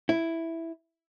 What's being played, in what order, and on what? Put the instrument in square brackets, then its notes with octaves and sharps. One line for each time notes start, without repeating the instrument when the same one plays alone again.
[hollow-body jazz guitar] E4